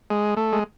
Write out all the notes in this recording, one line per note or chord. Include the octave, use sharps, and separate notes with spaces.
G#3
A3
G#3